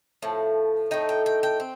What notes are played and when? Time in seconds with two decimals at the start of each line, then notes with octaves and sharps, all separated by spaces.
0.22 A2 F3
0.91 A2 A3 D#4 G5
1.09 G5
1.26 G5
1.43 G5
1.60 C4